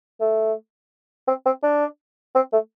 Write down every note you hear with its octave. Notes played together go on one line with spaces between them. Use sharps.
A3
C4
C4
D4
C4
A3